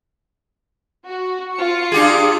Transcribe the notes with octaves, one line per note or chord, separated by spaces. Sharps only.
F#4
F4 C#7
D4 G4 G#4